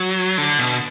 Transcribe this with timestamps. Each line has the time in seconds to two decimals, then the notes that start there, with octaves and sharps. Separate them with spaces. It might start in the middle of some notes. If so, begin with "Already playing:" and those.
Already playing: F#3
0.38 D3
0.59 B2